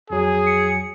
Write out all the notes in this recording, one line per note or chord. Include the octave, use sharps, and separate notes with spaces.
F2 F#3 G#4
C#7